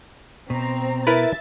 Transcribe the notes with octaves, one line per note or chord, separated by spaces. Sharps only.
B2 C4 A#5
E4 A#4 B4 E5 A6